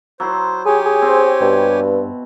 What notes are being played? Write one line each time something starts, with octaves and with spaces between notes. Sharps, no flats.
F#3 E4 C5 C6
G4 G#4 C#5 G#5
G#4
C4
G2 B2